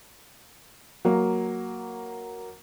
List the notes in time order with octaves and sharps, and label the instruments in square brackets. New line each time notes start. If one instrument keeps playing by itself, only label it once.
[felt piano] F#3 A#3